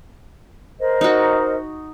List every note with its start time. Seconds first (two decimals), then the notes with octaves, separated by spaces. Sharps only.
0.78 A#4 C5 D#5
1.01 D#4 F#4